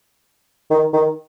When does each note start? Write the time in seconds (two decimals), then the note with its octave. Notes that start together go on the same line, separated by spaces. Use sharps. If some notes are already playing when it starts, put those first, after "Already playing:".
0.71 D#3
0.93 D#3